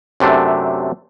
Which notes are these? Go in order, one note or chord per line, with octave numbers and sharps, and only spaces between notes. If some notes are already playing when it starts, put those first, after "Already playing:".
F#2 C3 A3 D4